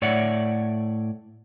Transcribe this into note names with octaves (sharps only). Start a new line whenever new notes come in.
A2 C#5 D5 E5 F#5